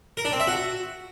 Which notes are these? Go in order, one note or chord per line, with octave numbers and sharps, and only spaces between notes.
A#4
D4
C4
E5
F#4